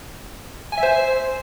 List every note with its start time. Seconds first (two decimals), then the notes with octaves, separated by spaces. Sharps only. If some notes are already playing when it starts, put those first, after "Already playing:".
0.72 G#5
0.78 E5
0.83 C5